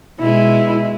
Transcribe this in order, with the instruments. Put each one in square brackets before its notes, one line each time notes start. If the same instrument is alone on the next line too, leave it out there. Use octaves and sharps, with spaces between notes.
[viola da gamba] B2 G#3 [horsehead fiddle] E4